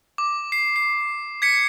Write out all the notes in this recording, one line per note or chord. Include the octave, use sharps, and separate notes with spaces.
D6
C7
C7
G#6 B6 C#7